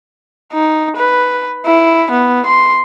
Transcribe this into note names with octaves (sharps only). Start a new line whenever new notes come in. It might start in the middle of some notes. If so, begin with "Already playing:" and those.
D#4
B4
E4
B3
C6